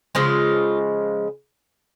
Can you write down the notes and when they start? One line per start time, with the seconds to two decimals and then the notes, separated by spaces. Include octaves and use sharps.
0.15 C#3 F3 G#3 F4